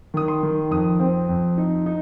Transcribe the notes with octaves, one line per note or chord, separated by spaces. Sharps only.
D#3 D#6
C6
D#3
F2 D#6
C4
F2
D#4
D#4